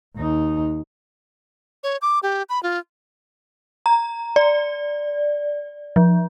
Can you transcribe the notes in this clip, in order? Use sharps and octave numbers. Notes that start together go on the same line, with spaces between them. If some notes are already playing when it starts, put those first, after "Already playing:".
D#2 D#4
C#5
D6
G4
B5
F4
A#5
D5
F3